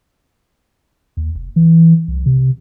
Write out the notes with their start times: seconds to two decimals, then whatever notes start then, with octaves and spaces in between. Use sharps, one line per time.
1.17 D#2
1.35 F1
1.56 E3
2.08 C2
2.26 C3